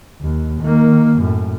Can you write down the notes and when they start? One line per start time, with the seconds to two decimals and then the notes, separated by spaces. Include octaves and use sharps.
0.21 D#2
0.62 D#3 A#3
1.19 F#2 A2